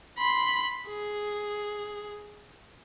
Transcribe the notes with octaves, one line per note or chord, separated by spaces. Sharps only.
B5 C6
G#4